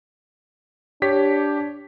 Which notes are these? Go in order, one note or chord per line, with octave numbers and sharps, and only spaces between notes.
D4 G4 C#5 B6